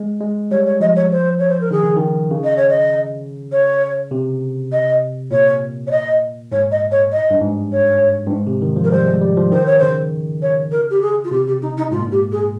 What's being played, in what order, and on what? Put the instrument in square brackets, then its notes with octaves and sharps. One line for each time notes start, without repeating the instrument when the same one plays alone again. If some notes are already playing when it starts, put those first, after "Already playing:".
Already playing: [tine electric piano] G#3
G#3
[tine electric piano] G3 [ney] C#5
[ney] C#5
[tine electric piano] F3 [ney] D#5
[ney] C#5
C5
C#5
C5
A#4
[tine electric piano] D#3 [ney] G#4
[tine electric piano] C#3
D#3
C#3
[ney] D#5
C#5
D#5
C#5
[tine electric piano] C3
[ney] D#5
[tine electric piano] A#2 [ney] C#5
[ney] C#5
D#5
[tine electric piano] G#2 [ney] C#5
[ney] D#5
C#5
D#5
[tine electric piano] G2
G#2
[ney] C#5
[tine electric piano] G2
G#2
C3
D#3
F3
[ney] A#4
[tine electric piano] G3 [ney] C5
[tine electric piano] G#3
G3
F3
[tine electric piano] D#3 [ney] C5
[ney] C#5
[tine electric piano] C#3 [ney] C5
[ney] C#5
A#4
G4
G#4
F4
[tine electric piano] C3 [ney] G4
[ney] G4
D#4
D#4
[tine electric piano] G#2 [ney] F4
[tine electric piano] A#2
[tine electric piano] G#2 [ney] G4
[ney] G#4